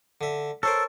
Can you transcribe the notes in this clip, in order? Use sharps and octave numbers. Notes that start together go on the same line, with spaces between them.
D3 E5
A4 A#4 C5 C#5